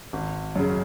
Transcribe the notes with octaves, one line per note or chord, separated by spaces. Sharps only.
G#1
F#2 C#3